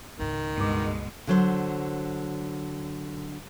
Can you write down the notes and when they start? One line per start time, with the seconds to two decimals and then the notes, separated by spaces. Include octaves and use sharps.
0.19 C#2 G#2 D#3
0.58 G2 B2 G#3 D6
1.27 D3 F#3 C5